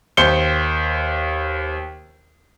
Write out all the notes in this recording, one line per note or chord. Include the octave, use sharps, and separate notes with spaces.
D#2 C5 C#7 G7